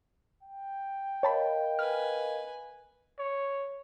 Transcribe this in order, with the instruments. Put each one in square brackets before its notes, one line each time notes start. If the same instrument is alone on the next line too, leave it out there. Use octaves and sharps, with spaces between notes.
[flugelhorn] G5
[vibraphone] A#4 D#5 F5 [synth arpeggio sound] C#5 A5 B5
[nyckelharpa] B4 G#5 [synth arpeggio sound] F6
[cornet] C#5